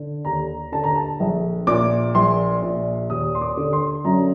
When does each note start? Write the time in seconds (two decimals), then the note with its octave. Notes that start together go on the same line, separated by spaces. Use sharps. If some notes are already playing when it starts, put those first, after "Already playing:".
Already playing: D3
0.25 D#2 A#5
0.72 D3 A5
0.84 A#5
0.96 A5
1.20 A#1
1.67 A#2 D6
2.15 A#1 C6
2.62 A#2
3.10 D#2 D#6
3.35 C6
3.41 D6
3.57 D3
3.73 C6
4.05 F#2 A#5